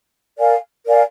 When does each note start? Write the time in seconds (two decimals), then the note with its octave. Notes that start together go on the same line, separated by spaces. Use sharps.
0.38 A#4 D5 F5 G#5
0.85 A#4 D5 F5 G#5